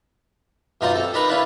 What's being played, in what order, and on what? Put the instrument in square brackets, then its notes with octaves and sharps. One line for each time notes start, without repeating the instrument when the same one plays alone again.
[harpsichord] F#2 B2 D#4 F4 D5 A#5
C4 A4
D4 D#4 A#4 B4 A#5 B5
C#4 D4 E4 F4 B4 D5